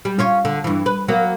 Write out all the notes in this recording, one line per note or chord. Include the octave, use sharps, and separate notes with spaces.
G3
C#4 F4 C#5
D3
G2 E3
B4
F#3 A#3 B3